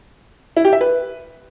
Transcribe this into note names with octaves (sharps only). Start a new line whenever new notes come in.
E4
G4
E5
B4